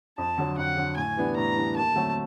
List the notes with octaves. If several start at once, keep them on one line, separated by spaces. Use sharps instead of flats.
F2 A5
D3 F#3
F2 F#5
D3 F#3
A2 G#5
E3 G3 B3 D4
A2 A#5
E3 G3 B3 D4
D#2 A5
D3 F#3 A3 C4